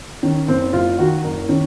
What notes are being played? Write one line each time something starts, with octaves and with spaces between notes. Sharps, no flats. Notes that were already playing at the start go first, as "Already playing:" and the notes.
D#3 C#4
F#1 C4
F#1 F4
D#3 F#4
F#1 A#4
D#3 C#4